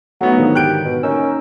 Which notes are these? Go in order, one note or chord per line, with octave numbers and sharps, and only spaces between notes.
F#3 A3 B3 D#4 F#4
G#2 D3 D#3 F3
G4 F#6 G6 D7
B2
A#3 C#4 D#4 E6